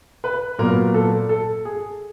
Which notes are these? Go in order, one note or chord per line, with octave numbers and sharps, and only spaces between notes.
B4
A#2 F#3 B3 A#4
A4
A4
G#4